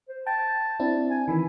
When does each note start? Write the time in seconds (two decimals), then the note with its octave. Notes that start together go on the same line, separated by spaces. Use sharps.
0.09 C5
0.27 G5 A5
0.80 C4 D4 E4
1.11 G#5
1.28 D#3 E3 E4